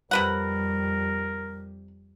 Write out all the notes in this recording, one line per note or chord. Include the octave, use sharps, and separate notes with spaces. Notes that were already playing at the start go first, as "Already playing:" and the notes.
F2 C3 G3 A#4 B4 F#5